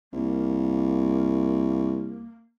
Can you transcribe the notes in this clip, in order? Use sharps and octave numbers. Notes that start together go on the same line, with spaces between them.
C2 A#3